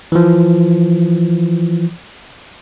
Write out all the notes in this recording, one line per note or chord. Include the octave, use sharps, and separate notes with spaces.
E3 F3